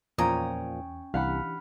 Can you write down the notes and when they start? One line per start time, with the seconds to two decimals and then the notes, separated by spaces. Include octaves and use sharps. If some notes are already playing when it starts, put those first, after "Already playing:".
0.18 E2 A#2 F3 C#4 G5 A#5 D#6
1.14 C2 E3 D4 G4 F5 F#5 B5